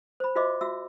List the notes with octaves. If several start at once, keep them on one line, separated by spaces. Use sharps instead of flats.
C5 B5
F4 F#4 C5 D#5 E5 D6
F4 F#4 E5 E6